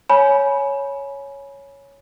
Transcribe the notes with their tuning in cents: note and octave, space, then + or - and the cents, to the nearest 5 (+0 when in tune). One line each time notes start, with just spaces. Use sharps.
C#5 +0 G#5 +20 B5 -20